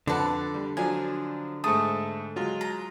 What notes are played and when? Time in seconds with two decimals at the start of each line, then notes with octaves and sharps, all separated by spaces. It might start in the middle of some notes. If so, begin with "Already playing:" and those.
0.07 F2 D3 B4 D5 F#5 A5
0.54 G3
0.77 F3 F#3 D4 G#5
1.64 G#2 A3 A5 D#6
2.36 F#3 G#3 F4
2.61 A#5